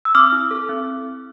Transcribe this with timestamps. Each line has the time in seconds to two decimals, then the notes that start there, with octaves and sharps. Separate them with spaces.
0.05 E6
0.15 C4 D6 F6
0.32 E4
0.51 A4
0.69 C4